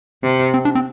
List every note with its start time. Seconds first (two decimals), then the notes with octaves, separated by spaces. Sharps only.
0.23 C3
0.54 C4
0.65 D4
0.75 C4